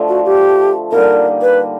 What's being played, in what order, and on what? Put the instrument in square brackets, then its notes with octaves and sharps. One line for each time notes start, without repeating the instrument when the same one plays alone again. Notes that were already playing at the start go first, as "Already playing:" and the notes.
Already playing: [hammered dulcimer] D3 F3 A3
[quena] F#4
G4
[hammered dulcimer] D3 G3 A#3 D#4 [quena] A#4
[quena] B4